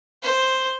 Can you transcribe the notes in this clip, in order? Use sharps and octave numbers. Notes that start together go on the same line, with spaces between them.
C5